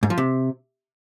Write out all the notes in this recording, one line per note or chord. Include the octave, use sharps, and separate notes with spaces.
G#2
F3
C3